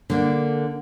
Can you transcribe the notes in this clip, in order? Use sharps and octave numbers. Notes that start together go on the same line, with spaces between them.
D3 A#3 D4